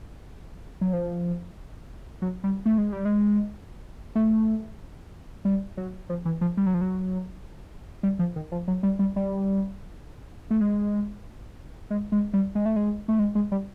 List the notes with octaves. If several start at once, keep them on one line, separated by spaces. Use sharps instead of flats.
F#3
F3
F#3
G3
A3
G#3
G3
G#3
A3
G3
F#3
F3
E3
F3
G3
F#3
F3
F#3
G3
F3
D#3
F3
F#3
G3
G3
G3
A3
G#3
G#3
G#3
G3
G#3
A3
G#3
A3
G#3
G#3
G3